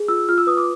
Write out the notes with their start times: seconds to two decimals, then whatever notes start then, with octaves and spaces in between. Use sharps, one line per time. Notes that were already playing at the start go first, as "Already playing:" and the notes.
Already playing: G#4
0.08 F4 E6
0.29 F4 F6
0.38 E6
0.47 B4 D#6
0.57 D6